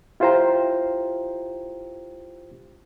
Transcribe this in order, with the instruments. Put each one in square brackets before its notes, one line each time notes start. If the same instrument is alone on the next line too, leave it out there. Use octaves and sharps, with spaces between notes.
[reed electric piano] E4 F4 G4 C5 G5 A#5